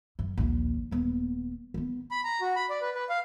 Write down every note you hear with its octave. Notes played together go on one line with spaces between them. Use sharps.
F#2
A#1 D#2
D#1 B3
A#3 B3
B5
A#5
F#4
B5
D5
B4
B4
F5